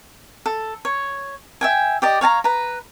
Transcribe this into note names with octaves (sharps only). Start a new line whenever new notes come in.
A4
C#5
E5 G5 G#5
G4 D5 D#5
C#5 F5 A5 A#5
B4 A#5